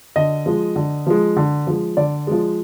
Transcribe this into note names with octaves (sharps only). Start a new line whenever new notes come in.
D3 D#5
F3 G#3
D3
F3 G#3
D3
F3 G#3
D3 D5
F3 G#3